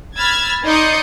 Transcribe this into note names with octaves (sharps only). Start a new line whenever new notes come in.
B5 E6 F6 G#6 A6
D#4 D5 C6 D#6 G6 C#7